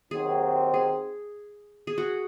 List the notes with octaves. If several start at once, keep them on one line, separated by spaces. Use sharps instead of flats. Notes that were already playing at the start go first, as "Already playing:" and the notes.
D#2 D#3 F#3 C4 G#4
G#4
G#4
F#4